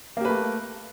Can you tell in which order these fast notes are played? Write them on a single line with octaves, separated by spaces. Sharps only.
A#3 G4 B4 A3